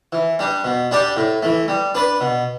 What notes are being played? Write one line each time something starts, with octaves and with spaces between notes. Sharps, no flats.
E3
G3 D4
B2
G3 D4 G4 D5
A2
E3 A3
G3
D4 B4 D5
B2